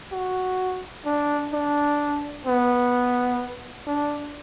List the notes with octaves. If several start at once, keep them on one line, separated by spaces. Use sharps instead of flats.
F#4
D4
D4
B3
D4